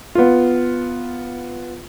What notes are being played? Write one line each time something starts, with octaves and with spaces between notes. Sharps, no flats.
B3 F4